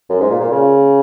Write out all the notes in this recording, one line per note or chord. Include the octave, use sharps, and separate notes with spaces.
F#2
G#2
A#2
A#2
C#3